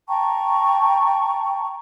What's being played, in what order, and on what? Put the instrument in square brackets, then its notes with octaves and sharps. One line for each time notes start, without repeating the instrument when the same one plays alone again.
[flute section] G5 A5 A#5 C#6